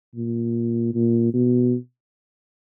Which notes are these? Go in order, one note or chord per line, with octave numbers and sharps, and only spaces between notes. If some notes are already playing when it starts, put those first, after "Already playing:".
A#2
A#2
B2